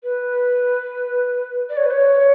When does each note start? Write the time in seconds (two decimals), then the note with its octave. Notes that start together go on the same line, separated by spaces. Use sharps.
0.03 B4
1.70 D5
1.77 C#5
1.84 B4
1.91 C#5